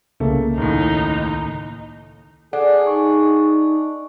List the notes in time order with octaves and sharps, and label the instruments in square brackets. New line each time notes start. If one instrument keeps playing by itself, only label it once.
[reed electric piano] C2 C#3 A#3 [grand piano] A3
[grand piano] D#2 A2 [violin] D#4
[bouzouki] D4 [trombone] G#4 [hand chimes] A4 D5 F#5
[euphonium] D#4 [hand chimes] C#6